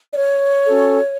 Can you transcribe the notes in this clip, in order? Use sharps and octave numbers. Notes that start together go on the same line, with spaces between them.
D5
C#5
C#4 F#4 A4